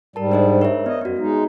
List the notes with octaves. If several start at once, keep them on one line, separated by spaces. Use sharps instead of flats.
G#2 G3 A#4 A5
D4 C5 D#5
A#4 C#5 E5
B3 D#5
F#2 B3 F#4
G#3 D#4